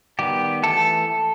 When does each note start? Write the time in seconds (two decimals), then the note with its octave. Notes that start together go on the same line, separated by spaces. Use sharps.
0.19 D#3 G3 B3 G4
0.63 E3 A3 A4